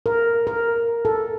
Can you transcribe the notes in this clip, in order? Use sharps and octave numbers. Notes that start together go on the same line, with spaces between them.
A#4
A#4
A4